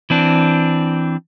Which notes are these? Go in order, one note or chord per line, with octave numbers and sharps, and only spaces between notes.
E3 C4 D4